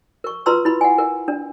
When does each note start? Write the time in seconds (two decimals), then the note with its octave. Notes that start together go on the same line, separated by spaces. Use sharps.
0.24 A#4 C#6
0.46 F4 B4 A#5 C6 E6
0.65 E4 B5
0.81 F#5 G#5
0.98 A#4
1.28 D4